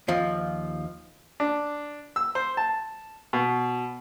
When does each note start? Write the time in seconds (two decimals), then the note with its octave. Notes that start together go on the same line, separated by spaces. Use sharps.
0.08 D#2 F3
1.40 D4
2.16 E6
2.35 C5
2.57 A5
3.33 B2